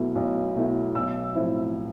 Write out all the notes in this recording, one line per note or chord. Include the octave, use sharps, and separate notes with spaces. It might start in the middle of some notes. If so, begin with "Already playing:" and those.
Already playing: B1 B2 A3 E4
B1
B2 A3 E4
B1 E6
A2 F3 C4 E4